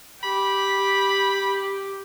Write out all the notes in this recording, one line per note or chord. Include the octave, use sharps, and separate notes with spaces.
G4 B5